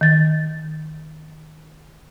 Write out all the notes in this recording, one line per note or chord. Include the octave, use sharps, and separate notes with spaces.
D#3 A6